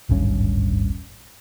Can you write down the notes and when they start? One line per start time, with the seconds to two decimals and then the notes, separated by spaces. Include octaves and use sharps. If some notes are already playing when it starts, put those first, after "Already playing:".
0.09 D1 G#1 G2 C#4